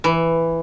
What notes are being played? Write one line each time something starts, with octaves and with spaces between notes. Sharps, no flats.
E3